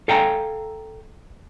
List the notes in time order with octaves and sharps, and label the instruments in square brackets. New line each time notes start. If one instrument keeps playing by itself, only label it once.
[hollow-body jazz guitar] A4 F5 G5 G#5 A#5